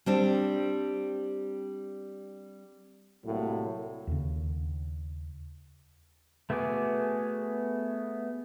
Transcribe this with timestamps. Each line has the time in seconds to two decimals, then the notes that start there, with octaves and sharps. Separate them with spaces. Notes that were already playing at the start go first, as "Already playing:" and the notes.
0.06 G3 C4 D4
3.24 C2 A2 F#3 A#3
4.07 D#2 C#3
6.50 A3 B3 F#4 G#4 D6